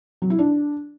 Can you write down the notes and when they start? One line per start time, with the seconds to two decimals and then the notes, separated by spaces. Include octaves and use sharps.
0.22 F#3
0.30 E4
0.38 D4